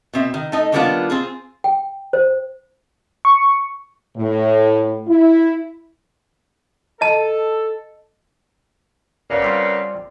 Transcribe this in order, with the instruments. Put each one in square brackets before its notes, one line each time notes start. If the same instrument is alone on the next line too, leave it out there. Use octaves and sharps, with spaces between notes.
[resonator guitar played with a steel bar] B2 C4 E5
D#3
A3 D#4 D#5
D#3 G3 A#3 B3 D4 F4
C4 F4 G#4
[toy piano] G5
C5
[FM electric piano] C#6
[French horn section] A2
E4
[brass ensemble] A4 [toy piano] D#5 A5
[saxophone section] C#3 A#3 B3 [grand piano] D5
[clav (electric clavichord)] G3 C4 F4